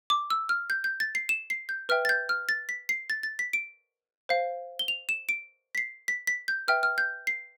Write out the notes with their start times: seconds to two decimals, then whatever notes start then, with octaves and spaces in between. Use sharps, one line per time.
0.10 D6
0.30 E6
0.49 F6
0.70 G6
0.84 G6
1.00 A6
1.15 C7
1.29 E7
1.50 C7
1.69 G6
1.89 B4 E5 G5 F6
2.05 A6
2.09 G6
2.29 F6
2.49 A6
2.69 B6
2.89 C7
3.10 A6
3.23 A6
3.39 B6
3.53 D7
4.29 C5 F5
4.79 G7
4.88 F7
5.09 E7
5.29 D7
5.75 B6
5.78 C7
6.08 B6
6.27 B6
6.48 G6
6.68 B4 E5 G5 F6
6.83 F6
6.98 G6
7.27 C7